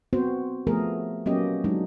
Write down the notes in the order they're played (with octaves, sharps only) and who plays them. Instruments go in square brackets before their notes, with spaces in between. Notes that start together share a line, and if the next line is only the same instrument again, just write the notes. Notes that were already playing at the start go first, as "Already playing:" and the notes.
[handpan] B3 C4 F#4 C5
F3 A3 B3 G#4 A#4
F#3 A#3 B3 C#4 G4 D#5
F#3 G#3 D4 D#4